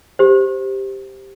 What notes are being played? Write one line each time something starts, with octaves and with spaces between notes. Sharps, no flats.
G4 C5